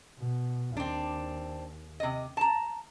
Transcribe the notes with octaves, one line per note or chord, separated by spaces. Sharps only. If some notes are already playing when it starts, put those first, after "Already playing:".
B2
D#2 C4 D4
C3 D#5
A5 A#5